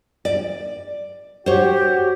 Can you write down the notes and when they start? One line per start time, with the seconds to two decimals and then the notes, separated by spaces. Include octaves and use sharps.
0.25 D5
1.46 F#4 G4 C5 C#5